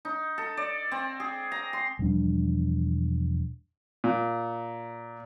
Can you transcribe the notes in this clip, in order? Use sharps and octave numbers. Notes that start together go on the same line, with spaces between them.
D#4
A4
D5
C4
G#4
A#5
C6
E1 F3 G3 D4
A#2